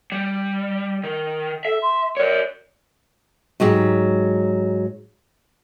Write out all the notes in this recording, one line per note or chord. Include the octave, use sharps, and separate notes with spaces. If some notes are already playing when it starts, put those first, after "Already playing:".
G3
D#3
A4 E5
C6
A#4 C#5 D5
G#2 F#3 G#3 G4